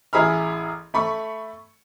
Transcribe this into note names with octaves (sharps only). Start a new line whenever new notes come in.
A1 E4 G#4 A#5 B5 F6
A3 B5 C#6